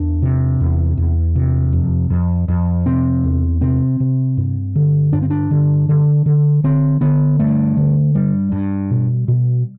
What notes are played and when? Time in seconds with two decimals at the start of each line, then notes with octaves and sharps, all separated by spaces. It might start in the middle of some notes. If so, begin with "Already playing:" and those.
Already playing: E2 D4
0.22 C3
0.60 E2
0.97 E2
1.35 C3
1.73 F2
2.10 F2
2.48 F2
2.86 C3 C4
3.24 E2
3.61 C3 C4
4.00 C3
4.37 G2
4.75 D3
5.13 G2 D4
5.22 C4
5.30 D4
5.51 D3
5.89 D3
6.26 D3
6.64 D3 C4
7.01 D3 B3
7.39 G2 A3
7.77 D3
8.15 G2 G3
8.52 G2
8.91 B2
9.28 B2